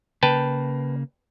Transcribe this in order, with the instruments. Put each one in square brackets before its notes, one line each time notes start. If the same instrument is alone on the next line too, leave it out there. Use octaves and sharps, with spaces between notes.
[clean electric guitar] C#3 A#3 [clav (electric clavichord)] B4 G5 A5